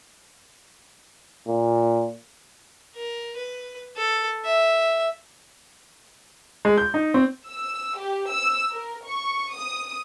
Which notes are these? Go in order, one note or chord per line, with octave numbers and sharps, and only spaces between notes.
A#2
A#4
B4
A4
E5
G#3
G6
D#4
C4
E6
G4
E6
A#4
C#6
D#6